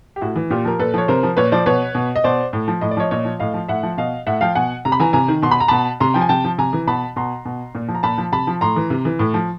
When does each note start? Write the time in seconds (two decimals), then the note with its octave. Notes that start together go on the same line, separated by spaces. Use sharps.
0.16 G4
0.21 A2 E4 F#4
0.36 E3
0.50 A#2 F4 G4
0.65 F3 A#4
0.79 A#2 A4 B4
0.94 F3 C#5
1.08 C3 A#4 C5
1.23 F3
1.37 A#2 B4 C#5
1.52 F3 C5 D5
1.66 B2 B4 C#5
1.95 B2
2.16 D#5
2.24 B2 C5 D5
2.53 A2
2.68 F3
2.81 A2 D#5
2.91 D5
2.97 F3 C#5 D#5
3.11 A#2 C#5 D#5
3.25 F3
3.39 A2 D#5 F5
3.54 F3
3.68 A2 E5 F#5
3.83 F3
3.98 B2 D#5 F5
4.27 A2 E5 F#5
4.41 F3 F5 G5
4.55 B2 F#5 G#5
4.85 C3 A#5
4.92 B5
5.00 E3 G#5 A#5
5.13 C3 G#5 A#5
5.28 D#3
5.42 B2 C6
5.51 B5
5.60 A#5
5.68 B2 A5 B5
6.00 C3 A#5 C6
6.14 F3 G5
6.22 G#5
6.29 C3 G5 A5
6.44 F3
6.58 C3 G#5 A#5
6.73 E3
6.87 B2 A5 B5
7.16 B2 A#5 C6
7.45 B2
7.75 A#2
7.88 F3
7.95 A#5
8.03 A#2 A5 B5
8.18 F3
8.32 C3 A5 B5
8.47 F3
8.61 A2 A#5 C6
8.76 E3
8.90 C3
9.05 E3
9.19 A2
9.34 F3